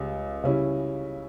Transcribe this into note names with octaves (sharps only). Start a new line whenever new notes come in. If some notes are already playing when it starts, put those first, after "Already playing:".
Already playing: C#2 C#3 G3
C#3 G3 C#4 E4